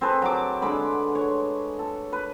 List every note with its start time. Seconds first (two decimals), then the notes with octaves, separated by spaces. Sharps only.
0.01 C4 G#4 A4 B4
0.22 F#3 D6
0.62 D3 G#3 B5 D6
1.15 C#5
1.79 A4
2.13 B4